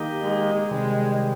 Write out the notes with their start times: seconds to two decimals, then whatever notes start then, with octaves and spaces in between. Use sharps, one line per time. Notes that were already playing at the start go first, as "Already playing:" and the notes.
Already playing: D#3 A#3 D#4 G4
0.21 G#3
0.71 C3 D#3 G3 G#3